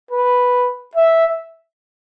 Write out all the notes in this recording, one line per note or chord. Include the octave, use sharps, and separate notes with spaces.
B4
E5